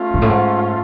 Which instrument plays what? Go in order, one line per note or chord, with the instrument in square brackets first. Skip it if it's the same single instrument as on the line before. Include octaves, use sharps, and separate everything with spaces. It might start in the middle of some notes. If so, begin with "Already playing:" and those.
Already playing: [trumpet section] A3 C#4 F4
[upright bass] G#2
A2
G#2